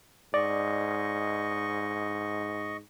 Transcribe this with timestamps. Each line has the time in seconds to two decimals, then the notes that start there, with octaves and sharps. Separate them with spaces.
0.34 G#2 D5 D#5 C#6